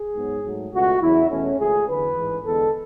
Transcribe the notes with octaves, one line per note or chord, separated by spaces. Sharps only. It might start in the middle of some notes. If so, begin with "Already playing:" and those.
Already playing: G#4
G#2 F#3 B3
G#2 F#3 A3
C#2 B2 A3 F#4
E2 C#3 F#3 E4
E2 B2 A3 C#4
C#2 B2 A3 G#4
E2 D3 F#3 B4
A1 G#2 E3 G#3
E2 D3 G#3 B3 A4